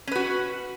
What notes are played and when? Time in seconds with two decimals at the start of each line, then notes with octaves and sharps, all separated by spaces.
0.07 C#4
0.11 B4
0.15 F#4